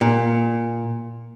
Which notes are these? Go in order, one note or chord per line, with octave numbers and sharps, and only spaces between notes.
A#2